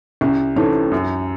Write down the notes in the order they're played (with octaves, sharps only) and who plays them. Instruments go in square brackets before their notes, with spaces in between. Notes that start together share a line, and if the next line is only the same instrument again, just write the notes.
[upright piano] C2 [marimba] C#4
[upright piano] C3 E3 A3 C#4 [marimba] D#4
[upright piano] F#2